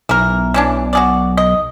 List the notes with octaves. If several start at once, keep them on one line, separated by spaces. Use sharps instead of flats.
B1 E3 A#4
E3 C#4 D4
F#4 G#4 D5
D#5